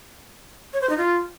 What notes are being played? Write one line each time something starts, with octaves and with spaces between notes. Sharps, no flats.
C#5
C5
D#4
F4